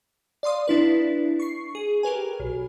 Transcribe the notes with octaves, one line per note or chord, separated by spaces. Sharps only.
D5 F5 C6 D#6
D4 E4 B4
C#6 C7
G#4
G4 A#4 B4 G#5
B1